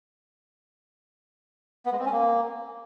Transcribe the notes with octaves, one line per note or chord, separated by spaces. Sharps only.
B3
G#3
C4
C#4
A#3